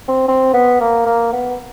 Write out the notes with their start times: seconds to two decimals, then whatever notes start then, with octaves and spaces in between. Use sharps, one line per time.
0.08 C4
0.28 C4
0.54 B3
0.80 A#3
1.06 A#3
1.32 B3